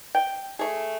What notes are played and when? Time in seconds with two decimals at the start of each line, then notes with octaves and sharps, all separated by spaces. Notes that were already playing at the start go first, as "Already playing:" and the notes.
0.15 G5
0.59 A3 G#4